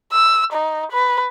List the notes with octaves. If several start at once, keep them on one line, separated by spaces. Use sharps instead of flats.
E6
D#4
B4